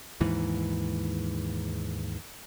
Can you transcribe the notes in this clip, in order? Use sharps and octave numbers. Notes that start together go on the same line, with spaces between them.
D#2 G#2 E3